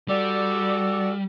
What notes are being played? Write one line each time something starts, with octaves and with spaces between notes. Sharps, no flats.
G3 F#4 A4 D5